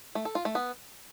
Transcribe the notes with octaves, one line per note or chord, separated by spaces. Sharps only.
A3
A4
F4
A3
B3